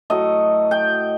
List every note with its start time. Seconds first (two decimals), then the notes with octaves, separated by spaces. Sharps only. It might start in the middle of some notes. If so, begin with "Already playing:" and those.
0.10 A2 F#3 A3 D#5
0.71 G5